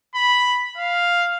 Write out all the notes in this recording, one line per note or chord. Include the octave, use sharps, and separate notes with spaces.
B5
F5